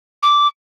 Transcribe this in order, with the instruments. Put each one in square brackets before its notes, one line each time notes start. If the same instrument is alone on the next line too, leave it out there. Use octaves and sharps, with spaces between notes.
[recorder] D6